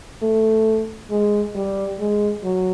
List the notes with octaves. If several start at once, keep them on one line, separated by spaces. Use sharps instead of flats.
A3
G#3
G3
G#3
F#3